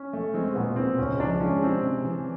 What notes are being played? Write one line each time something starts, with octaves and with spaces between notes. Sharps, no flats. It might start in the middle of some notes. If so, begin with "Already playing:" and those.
Already playing: C#4
A3
G#3 C4
A#2 B3
A#2 C4
C#2 C#4
F3 D4
G#3 C#4
C3 C4
C3
E3